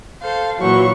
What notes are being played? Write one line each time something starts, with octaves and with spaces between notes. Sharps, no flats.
A4 C5 F5
A#2 E3 F#3 C#6